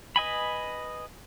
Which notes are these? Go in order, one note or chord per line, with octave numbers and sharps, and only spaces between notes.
B4 D#5 G#5 B5